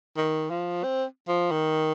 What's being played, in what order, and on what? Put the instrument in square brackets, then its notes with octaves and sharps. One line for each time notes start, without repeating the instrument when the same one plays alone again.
[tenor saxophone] D#3
F3
C4
F3
D#3